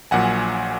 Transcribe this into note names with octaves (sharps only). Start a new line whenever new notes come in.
A#1 A#2 F#3 F#5 G#5